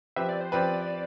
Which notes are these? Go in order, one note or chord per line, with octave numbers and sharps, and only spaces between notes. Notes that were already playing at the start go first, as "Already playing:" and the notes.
F3 C4 G4 B4 E5
D5
C5
F3 C4 G4 B4 D5